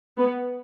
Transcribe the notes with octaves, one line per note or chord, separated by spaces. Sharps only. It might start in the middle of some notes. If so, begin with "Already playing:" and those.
B3